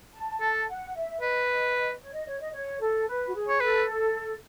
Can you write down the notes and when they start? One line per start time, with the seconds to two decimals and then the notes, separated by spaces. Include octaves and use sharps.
0.14 A5
0.41 A4 A5
0.68 F#5
0.95 E5
1.21 B4 D#5
2.01 C#5
2.13 D#5
2.26 C#5
2.39 D#5
2.53 C#5
2.81 A4
3.07 B4
3.26 F#4
3.34 G#4
3.48 C#5
3.60 A4 B4